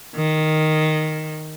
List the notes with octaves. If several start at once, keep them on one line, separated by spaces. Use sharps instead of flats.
D#3